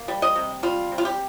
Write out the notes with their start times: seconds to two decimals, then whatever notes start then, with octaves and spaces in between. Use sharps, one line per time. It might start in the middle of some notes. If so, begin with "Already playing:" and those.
Already playing: A#3
0.08 G3
0.22 D#5
0.36 C3
0.63 G3 F4
0.92 C3
0.98 F4
1.05 G4